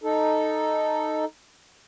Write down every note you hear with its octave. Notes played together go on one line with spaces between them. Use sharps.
D#4 A4